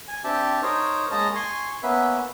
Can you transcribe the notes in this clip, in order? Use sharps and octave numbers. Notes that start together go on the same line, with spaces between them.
G#5
C4 D4 G4 E5 G5 A5
D#4 A#4 C5 C#5
G#3 A#3 C#4 D#5 A5 A#5
G#5 C6 C#6
A#3 B3 C#4 B4 E5